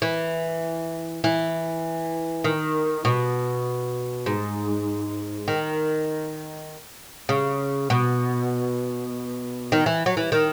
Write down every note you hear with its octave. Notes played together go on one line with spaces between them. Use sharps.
E3
E3
D#3
B2
G#2
D#3
C#3
B2
D#3
E3
F#3
E3
D#3